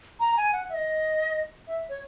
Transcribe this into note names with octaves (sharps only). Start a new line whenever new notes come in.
A#5
G#5
F#5
E5
D#5
E5
C#5